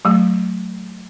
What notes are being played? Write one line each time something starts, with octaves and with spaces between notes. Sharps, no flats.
F#3 A3